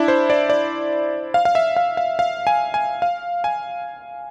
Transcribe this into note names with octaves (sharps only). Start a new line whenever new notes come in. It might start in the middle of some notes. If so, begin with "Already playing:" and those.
Already playing: D4 E4
C5
D5
D5
F5
F5
E5
F5
F5
F5
G#5
G#5
F5
G#5